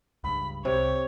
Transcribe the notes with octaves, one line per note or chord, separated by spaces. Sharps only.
C#2 G2 B5
C2 C3 G4 C#5